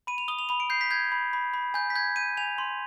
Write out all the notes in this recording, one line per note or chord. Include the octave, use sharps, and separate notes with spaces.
B5 D#7
F7
D#6 G7
F7
B5 F7
D7
G6 C7
B6
G6 G#6
B5
B5
B5
G#5 G6
B6
G6 G#6
G6 D#7
G#5 F7
C6